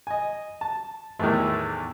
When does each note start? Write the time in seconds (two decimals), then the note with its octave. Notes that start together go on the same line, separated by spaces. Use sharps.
0.07 D#5 G#5
0.61 A5
1.19 E2 A2 D#3 E3 A3